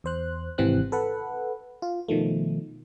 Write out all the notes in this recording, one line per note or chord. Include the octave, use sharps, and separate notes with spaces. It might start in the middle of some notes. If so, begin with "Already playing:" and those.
E2 C5 F#6
G#1 C3 E3 C4 F#6
A4 B4 F#5
F4
B2 D#3 F3 A3